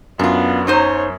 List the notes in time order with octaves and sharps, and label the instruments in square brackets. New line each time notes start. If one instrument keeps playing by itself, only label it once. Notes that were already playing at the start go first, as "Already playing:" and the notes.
[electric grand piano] F#2 [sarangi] B3 [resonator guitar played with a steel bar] D4 F4
[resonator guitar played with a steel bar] F#3 D#4 C5 [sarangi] C#5